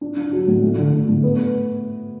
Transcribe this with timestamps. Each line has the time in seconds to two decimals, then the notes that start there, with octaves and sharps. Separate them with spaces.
0.01 D4
0.16 D4
0.33 F#3
0.48 A2
0.63 A3
0.78 D3
0.92 D3
1.08 A3
1.24 B3